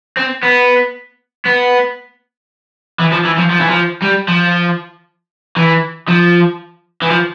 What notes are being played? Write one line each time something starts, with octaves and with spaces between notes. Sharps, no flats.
C4
B3
B3
E3
F3
E3
F3
F3
E3
F3
G3
F3
E3
F3
E3
F3